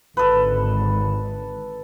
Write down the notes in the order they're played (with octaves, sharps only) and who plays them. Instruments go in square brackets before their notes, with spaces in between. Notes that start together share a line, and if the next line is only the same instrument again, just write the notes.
[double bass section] G#1 D3 [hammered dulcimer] A4 B4